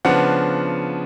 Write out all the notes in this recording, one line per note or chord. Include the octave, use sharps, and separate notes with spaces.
C#3 F3 B3 D4 F#5